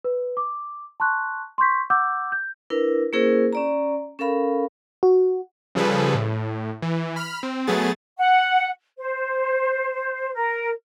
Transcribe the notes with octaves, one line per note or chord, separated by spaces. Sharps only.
B4
D6
A5 C6 C#6 F#6
C6 C#6 G6 B6
F#5 D6 E6 G6
G6
D4 E4 A#4 B4
A#3 C#4 E4 G#4 A#4 C5
C#4 D5 A#5
C#4 A4 A#4 F5 B5
F#4
C#3 F3 G3 G#4 A4 B4
A2
E3
B5 F6
C4
F#3 A3 B3 G#4 A6
F#5
C5
A#4